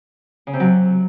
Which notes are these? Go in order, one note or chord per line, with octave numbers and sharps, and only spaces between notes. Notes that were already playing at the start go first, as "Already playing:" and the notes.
C#3
C3
F#3